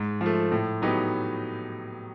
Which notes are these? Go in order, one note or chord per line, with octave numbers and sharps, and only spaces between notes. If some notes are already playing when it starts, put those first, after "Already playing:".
Already playing: G#2
F3 A3
A2
F#3 B3 D#4 G4